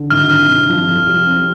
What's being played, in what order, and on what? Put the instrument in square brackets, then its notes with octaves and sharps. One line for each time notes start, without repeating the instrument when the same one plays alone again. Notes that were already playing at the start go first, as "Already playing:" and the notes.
Already playing: [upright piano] D3
[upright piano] G#1 [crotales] F6
[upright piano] G2 [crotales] F6
[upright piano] C3
F3
F2
G3
C4